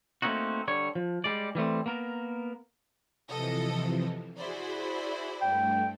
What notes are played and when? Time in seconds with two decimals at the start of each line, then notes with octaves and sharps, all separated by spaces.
0.22 A3 A#3 C4 C#4 D#4 F#4
0.68 D3 G3 C#5
0.95 F3
1.24 G3 G#3 D5
1.55 E3 G3 A3 C4
1.86 A#3 B3 A#4
3.28 C3 E3 F3 A4 D#5
4.36 E4 F#4 G#4 C5 D5 B5
5.42 G2 A3 G5